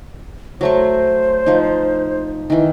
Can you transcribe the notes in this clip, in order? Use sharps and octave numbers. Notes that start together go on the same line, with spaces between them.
F#3 A3 C5 C#6
F3 D#4
D#3 E3